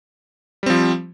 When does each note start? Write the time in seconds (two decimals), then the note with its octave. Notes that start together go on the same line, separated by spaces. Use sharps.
0.63 G3
0.66 C4
0.70 F3